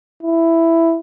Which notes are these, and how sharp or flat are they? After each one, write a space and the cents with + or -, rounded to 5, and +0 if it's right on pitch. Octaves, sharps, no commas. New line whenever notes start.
E4 +5